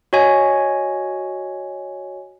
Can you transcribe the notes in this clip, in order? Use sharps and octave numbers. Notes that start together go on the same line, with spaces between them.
F#4 C#5 D#5 G#5